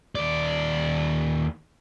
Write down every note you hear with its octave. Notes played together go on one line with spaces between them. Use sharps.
D#2 D5